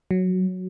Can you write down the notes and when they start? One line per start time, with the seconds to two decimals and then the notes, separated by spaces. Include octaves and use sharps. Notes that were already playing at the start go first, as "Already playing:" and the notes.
0.11 F#3